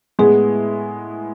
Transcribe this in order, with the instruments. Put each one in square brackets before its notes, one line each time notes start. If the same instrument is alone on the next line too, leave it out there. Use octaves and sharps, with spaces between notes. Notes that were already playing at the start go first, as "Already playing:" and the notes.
[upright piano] A2 G#3 B3 E4 [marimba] G#4